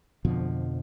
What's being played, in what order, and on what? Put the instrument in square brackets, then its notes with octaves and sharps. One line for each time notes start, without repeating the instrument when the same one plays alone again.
[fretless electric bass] F2 B2 D3 F3